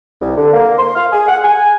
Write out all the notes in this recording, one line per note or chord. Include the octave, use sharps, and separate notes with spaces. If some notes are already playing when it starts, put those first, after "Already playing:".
C2
D3
A#3
C6
F5
G#4
F#5
G#5